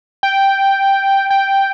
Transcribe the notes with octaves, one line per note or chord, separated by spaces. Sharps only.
G5
G5